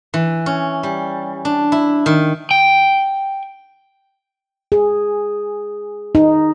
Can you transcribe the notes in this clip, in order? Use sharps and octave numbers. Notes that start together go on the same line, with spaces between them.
E3
C#4
G3
D4
E4
D#3
G5
G#4
D#4